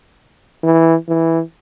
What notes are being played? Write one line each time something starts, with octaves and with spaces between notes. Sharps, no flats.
E3
E3